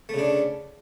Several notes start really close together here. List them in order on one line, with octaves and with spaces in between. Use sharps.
A3 C#3 D4